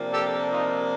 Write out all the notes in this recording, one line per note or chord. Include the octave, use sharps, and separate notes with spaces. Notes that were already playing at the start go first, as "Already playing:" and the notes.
Already playing: C3 F3 A#3 D4
G4 A4
D#4 F4